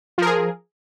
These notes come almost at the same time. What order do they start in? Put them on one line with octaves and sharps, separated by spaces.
F3 A#4 G#4